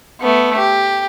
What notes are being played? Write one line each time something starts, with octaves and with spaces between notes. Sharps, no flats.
A3 B3
G4